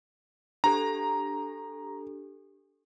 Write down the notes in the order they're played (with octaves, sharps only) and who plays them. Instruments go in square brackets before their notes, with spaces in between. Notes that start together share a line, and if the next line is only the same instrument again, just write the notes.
[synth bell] D4 G4 A4 [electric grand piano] A#5